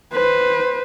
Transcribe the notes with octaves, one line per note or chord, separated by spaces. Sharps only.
B4 C5